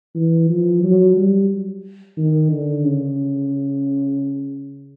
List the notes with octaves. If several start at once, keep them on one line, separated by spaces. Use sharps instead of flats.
E3
F3
F#3
G3
D#3
D3
C#3